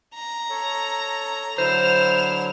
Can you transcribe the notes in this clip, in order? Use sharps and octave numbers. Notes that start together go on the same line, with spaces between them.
A#5
A4 C#5
D3 F#3 E4 C5 F6 E7